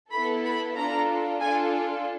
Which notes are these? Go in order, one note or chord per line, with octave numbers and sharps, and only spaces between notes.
B3 E4 A4 B5
B5
D4 F4 A4 A#5
D4 F4 A4 G#5